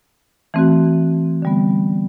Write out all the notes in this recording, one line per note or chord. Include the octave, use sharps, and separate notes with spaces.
E3 A3 C4 F#4
D3 G3 B3